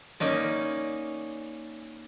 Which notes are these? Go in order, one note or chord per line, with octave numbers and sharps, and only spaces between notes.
A#3 C#4 D#4 D5